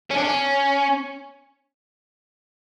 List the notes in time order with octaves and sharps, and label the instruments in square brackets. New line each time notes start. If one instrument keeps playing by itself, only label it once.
[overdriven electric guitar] C#4
D4
C#4